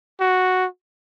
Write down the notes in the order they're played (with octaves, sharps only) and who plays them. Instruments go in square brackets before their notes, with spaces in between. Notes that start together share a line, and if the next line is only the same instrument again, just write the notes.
[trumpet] F#4